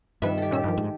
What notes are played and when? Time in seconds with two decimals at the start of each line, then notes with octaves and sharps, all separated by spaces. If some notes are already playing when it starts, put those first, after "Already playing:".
0.22 G2 C3 D#3 F3 B4 E5
0.38 G4 A4
0.51 A#2 C#4 E6
0.64 G2 D#3 F3
0.78 G#2